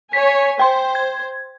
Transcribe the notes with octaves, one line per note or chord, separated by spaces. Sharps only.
C#5 G#5 B6
C5 G5 C6
G#6